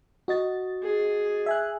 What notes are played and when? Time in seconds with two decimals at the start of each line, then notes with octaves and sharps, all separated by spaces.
0.28 F#4 D#5 A6
0.83 G#4
1.46 E5 G#5 F#6